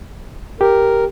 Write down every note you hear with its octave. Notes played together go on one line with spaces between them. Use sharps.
G4 A#4